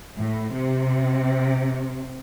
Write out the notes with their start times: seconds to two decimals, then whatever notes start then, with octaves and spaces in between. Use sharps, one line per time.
0.17 A2
0.53 C3